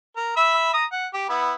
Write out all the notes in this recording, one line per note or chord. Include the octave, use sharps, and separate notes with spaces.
A#4
E5 B5 E6
A#5 D#6
F#5
G4
B3 E4